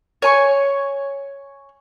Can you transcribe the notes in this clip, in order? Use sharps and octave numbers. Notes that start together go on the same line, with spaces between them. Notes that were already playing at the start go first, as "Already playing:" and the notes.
C#5 G#5 C#6